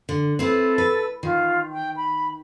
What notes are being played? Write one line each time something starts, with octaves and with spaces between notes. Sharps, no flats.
D3
C4 E4 A4 B4
B4
D#3 F4
G5
B5